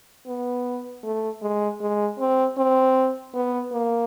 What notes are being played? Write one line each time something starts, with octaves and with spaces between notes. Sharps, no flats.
B3
A3
G#3
G#3
C4
C4
B3
A#3